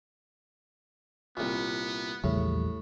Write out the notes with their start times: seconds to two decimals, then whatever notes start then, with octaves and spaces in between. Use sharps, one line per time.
1.37 C2 A#2 B3
2.24 A#1 E2 A2 C#3 G3